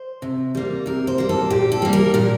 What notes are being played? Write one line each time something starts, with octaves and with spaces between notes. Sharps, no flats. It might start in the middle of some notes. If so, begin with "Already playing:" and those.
Already playing: C5
C3
G3 A#3
C3 A#4
C5
G3 A#3
A4
A#2 G4
A4
G3 A#3
A#4
A#2 A#4